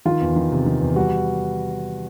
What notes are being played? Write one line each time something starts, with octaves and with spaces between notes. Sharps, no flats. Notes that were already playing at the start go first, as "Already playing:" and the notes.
D#3 F4
E2
D#3
C3
D#3
E2
G3 F#4